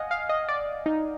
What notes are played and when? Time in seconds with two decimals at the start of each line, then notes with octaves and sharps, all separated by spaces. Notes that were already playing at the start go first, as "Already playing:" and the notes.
Already playing: D#5 F5 F#5 G#5
0.11 F5
0.29 D#5
0.48 D5
0.86 D#4